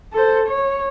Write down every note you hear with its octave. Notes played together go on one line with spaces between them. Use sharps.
A4 C5
C#5